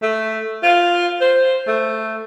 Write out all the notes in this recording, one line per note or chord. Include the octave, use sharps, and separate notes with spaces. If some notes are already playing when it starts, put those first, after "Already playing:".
A3
F4
C5
A3